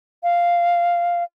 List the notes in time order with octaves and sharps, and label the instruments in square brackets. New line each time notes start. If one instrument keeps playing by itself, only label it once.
[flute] F5